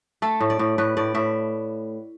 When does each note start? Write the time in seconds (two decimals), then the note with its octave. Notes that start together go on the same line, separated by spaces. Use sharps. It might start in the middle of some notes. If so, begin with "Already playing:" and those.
0.22 A3 A4
0.40 A2
0.50 D5
0.59 A2
0.78 A2 B4
0.97 A2 D5
1.15 A2 E5